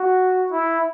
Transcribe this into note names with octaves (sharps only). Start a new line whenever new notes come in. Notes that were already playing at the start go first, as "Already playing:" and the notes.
Already playing: F#4
E4